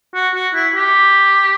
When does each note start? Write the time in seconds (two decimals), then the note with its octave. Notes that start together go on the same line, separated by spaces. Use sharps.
0.15 F#4
0.35 F#4
0.55 E4
0.75 G4